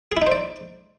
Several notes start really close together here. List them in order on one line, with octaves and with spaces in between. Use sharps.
G#4 E4 D#4 C5 D5